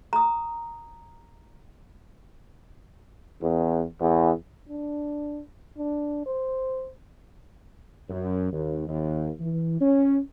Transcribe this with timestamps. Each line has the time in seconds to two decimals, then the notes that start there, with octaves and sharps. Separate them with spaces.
0.13 A#5 D#6
3.43 E2
4.01 E2
4.69 D4
5.78 D4
6.26 C5
8.09 F#2
8.52 D#2
8.88 D#2
9.40 E3
9.81 C#4